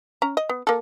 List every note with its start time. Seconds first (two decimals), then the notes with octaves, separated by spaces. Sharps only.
0.22 C#4 A#5
0.37 D#5
0.49 B3
0.67 A#3 A4